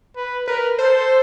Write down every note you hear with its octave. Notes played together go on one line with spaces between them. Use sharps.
B4
A#4 B4
A4 C5